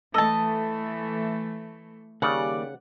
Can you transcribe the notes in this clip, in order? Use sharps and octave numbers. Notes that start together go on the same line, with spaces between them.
E3 A3 A4 D#5 A5
D#2 C#3 G3 D5 F#5